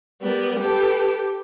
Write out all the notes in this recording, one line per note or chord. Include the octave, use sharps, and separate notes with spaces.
G3 B3 A#4
G4 A4 B4